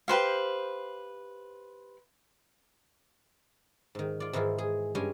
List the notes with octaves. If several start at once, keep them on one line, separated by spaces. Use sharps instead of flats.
G4 B4 C5 F5
G#2 D#3
F4 D5
G#2 D#3 E3 E4 F4
G#4
G2 G3 G#3 C#4 D#5 G#5